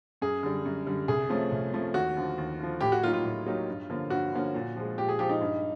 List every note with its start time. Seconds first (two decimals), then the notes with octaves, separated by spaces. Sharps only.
0.22 F#2 G#4
0.43 D3 G3
0.65 F#2
0.87 D3 G3
1.08 C2 G#4
1.29 C3 F3 A3 C#4
1.52 C2
1.73 C3 F3 A3 C#4
1.94 D#2 F#4
2.17 D3 F3
2.38 D#2
2.60 D3 F3
2.81 A2 G4
2.92 F#4
3.03 F#3 A#3 D#4 F4 G4
3.13 F4
3.24 A2
3.46 F#3 A#3 D#4 G4
3.68 G2
3.90 D3 F3 A#3 C#4
4.10 G2 F#4
4.33 D3 F3 A#3 C#4
4.55 A#2
4.76 F3 G#3
4.98 A#2 G4
5.09 G#4
5.19 F3 G#3 G4
5.29 D#4
5.41 G2